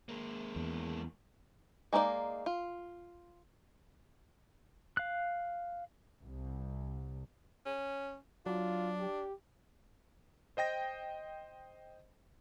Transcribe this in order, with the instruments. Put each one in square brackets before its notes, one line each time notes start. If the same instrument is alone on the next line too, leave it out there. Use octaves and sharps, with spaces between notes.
[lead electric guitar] G#3 A#3
[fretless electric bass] E2
[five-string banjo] G#3 A#3 D#4 E4 D5
F4
[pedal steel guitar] F5 F#6
[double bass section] C2
[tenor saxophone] C#4
[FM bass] F#3 [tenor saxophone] D4 [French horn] F4
[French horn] G4
[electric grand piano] C5 D#5 G5 A#6